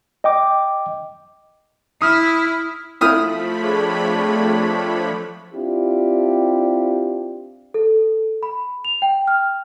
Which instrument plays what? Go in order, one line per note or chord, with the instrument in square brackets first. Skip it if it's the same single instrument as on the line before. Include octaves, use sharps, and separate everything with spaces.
[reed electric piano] D#5 G5 D6
[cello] E4 [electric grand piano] D#6 F6
[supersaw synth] F3 A3 B5 [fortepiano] E4 D#6 F6
[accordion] C4 D4 C#5 [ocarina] G#4
[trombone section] C4 D4 E4 F4 G4
[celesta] A4
B5
F7
G5
F6